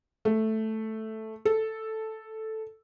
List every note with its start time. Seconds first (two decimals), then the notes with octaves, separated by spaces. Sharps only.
0.25 A3
1.45 A4